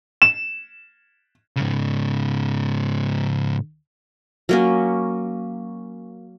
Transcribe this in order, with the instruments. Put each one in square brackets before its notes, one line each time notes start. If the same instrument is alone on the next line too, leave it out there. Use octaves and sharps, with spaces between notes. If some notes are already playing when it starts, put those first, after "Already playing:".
[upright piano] E7
[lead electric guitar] G#2 C#3
[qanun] F#3 A#3 C#4